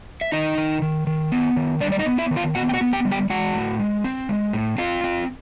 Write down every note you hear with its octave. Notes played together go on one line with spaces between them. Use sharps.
E5
D#3 D#4 D#5
D#3
D#3
D#3
B3
D#3
G3 D4 D5
D5
D#4 D#5
B3
E4 E5
D#3
F4 F5
B3 F#4 F#5
G5
F#4 F#5
B3
G4 G5
G3
G4 G5
G#3 F#4 F#5
A2
G#3
C4
G#3
A2
C4 F4 F5
C4